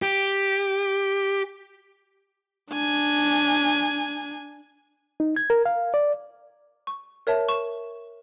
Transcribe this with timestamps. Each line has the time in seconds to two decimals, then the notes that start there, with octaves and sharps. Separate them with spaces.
0.02 G4
2.72 D4 G#5
5.20 D#4
5.36 G#6
5.50 A#4
5.66 F5
5.94 D5
6.87 C#6
7.27 A#4 C#5 E5 A5
7.49 C#6 E7